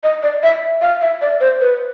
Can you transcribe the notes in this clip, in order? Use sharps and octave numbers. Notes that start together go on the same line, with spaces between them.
D#5
D5
E5
F5
E5
D5
C5
B4